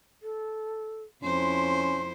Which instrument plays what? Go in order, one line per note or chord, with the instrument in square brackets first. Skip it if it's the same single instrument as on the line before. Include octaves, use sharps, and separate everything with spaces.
[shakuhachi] A4
[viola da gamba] F2 E4 C5 [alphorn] C#4 [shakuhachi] C6